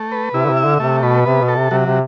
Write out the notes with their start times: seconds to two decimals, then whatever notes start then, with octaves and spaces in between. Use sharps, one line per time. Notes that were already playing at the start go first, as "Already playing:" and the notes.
Already playing: A3
0.12 B4
0.34 C3 E4
0.45 D3
0.50 C3
0.57 E5
0.64 D3
0.80 C3 A3
1.02 B2 B4
1.26 C3 B3
1.41 B2
1.48 A4
1.56 C3
1.70 C3 F#3
1.86 C3